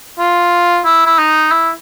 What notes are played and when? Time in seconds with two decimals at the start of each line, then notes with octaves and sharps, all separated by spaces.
0.20 F4
0.85 E4
1.06 E4
1.18 D#4
1.51 E4